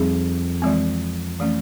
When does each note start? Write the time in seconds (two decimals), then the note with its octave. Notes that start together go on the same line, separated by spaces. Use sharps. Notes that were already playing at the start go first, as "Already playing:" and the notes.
Already playing: F2 G3 C4 D#4 G#4
0.62 E3 G#3 C4
1.40 E3 A3 C#4